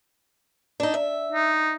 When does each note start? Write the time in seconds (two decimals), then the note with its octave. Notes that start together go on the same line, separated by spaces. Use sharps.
0.80 D4 D#4
0.94 E5
1.32 D#4